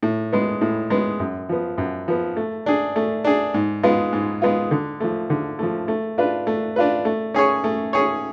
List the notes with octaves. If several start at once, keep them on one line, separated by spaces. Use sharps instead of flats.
A2
G#3 B3
A2
G#3 B3
F#2
F3 B3
F#2
F3 B3
A3
D4 G#4
A3
D4 G#4
G#2
G#3 B3 F4
G#2
G#3 B3 F4
D3
F3 A3
D3
F3 A3
A3
D4 F4 B4
A3
D4 F4 B4
A3
C#4 G#4 C#5
A3
C#4 G#4 C#5